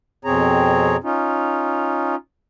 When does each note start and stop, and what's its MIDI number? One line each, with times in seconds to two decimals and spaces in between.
0.25 0.96 41
0.25 0.96 47
0.25 0.96 60
0.25 0.96 68
0.25 0.96 73
0.25 0.96 82
1.04 2.15 61
1.04 2.15 63
1.04 2.15 65